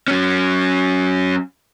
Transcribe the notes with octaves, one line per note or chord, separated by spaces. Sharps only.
F#3 C#4